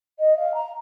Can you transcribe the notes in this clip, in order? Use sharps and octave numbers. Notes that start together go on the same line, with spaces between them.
D#5
F5
A#5